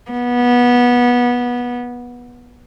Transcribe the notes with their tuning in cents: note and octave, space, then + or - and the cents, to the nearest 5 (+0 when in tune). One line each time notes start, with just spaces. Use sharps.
B3 -20